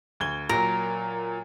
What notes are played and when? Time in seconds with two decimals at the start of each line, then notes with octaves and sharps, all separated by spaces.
0.20 D2 G#6 G7
0.49 A#2 F#3 A#4